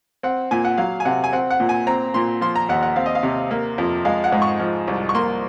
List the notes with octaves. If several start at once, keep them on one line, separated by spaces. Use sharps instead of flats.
C4 F#5
A#2 G#5
F#5
F#3 F5
G#5
C3 F#5
G#5
C4 F#5
F#5
A#2
G#5
C4 A#5
A#2 C6
F3 C6
A#5
D#2 F#5
F#5
C4 F5
D#5
F5
C3
A#3
F2
G#3 F5
F#5
G#2
C#6
F3
C2
C#6
A#3 C6